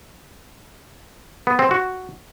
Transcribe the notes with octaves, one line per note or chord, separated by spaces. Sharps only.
B3
C4
F#4